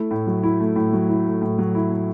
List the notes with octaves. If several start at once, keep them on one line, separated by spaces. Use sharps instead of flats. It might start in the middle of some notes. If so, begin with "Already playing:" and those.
Already playing: A3 E4
A2
F#3
E4
A3
A2
F#3
E4
A3
A2
F#3
E4
A3